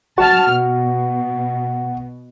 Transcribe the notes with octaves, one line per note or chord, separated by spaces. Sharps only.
F#4 A5 F6
B2